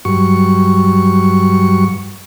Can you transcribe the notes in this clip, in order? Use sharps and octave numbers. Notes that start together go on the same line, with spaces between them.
G2 F#3 C#6